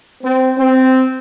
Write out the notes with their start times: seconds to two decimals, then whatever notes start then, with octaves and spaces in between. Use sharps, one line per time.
0.23 C4
0.57 C4